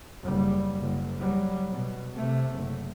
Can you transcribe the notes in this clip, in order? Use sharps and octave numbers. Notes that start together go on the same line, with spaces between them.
F#1 G3
F#1
F#3 G3
B2
C3 A3
F#1